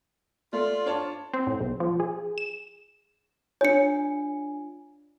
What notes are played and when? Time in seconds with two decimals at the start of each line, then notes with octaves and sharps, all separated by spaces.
0.53 A3 F4 D5
0.86 D4 C#5 A5
1.34 C4
1.47 A2
1.60 B1
1.80 F3
2.00 G#4
2.38 E7
3.61 D4 F4 C#5 G#5 C#7